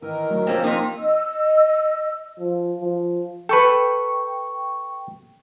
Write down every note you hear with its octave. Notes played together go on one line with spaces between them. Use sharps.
D#3 E3 A#4
D2 F#3
C3 F3 A#3 C4 C#4
F2 C4 D#4
D#5 E6
F3
F3
A4 B4 G5 C#6